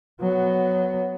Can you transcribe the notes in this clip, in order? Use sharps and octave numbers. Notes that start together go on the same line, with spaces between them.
F#3 B3